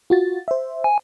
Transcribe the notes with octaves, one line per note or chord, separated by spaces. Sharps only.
F4 F#4 A6
C5 E5
G#5